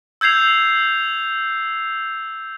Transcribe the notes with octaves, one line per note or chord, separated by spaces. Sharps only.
E6 G6 G#6 C7 F7